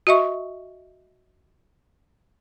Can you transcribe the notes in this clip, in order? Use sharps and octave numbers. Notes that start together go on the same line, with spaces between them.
F#4 D#5 E5 C#6